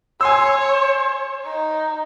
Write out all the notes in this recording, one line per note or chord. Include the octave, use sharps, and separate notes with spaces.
C#5 G#5 C6 E6
D#4